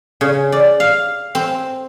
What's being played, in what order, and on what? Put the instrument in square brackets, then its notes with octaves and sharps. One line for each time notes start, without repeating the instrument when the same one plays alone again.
[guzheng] C#3
D5
F5
C4